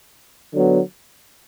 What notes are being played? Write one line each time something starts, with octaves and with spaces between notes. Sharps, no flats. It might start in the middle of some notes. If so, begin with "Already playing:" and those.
D3 F#3 B3